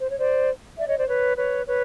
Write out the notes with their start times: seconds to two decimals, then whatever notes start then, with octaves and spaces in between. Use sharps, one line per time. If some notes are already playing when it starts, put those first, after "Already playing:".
0.01 C5
0.09 C#5
0.18 C5 D5
0.77 D5 E5
0.88 C#5 D#5
0.98 C5 D5
1.08 B4 C#5
1.37 B4 C#5
1.67 B4 C#5